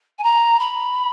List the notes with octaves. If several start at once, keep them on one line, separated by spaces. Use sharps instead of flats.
G#5
A#5
B5